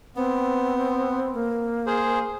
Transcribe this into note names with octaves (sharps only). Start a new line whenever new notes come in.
B3 C4
A#3
G#4 C5